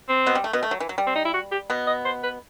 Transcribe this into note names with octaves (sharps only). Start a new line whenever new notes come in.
C4
B2 B3
G3
A3
B2 B3
A3
F#3
E3
F#3
G3
C4
D#4
E4
F#4
G4
B2 B3
D#5
C5
B4